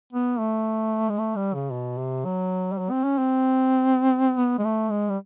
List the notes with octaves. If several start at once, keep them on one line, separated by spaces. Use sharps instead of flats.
B3
A3
G#3
A3
G3
C#3
B2
C3
F#3
G3
F#3
C4
C#4
C4
B3
G#3
A3
G#3
G3